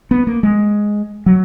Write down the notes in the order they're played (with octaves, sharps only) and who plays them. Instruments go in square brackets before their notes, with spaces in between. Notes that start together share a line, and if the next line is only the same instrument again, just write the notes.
[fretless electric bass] B3
A#3
G#3
F#3